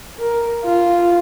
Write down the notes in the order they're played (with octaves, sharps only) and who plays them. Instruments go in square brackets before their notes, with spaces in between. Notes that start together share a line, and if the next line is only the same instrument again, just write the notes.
[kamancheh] A#4
F4